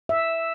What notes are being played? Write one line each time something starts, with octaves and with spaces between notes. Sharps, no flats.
E5